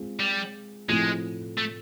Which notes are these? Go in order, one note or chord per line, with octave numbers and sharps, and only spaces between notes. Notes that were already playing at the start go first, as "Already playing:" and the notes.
Already playing: G#3 C4 F4
G3
A2 F3 G#3 A3 C4 E4
A3